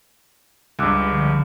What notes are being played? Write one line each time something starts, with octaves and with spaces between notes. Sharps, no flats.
C#2 G2 D6 E6 F#6
D3 F3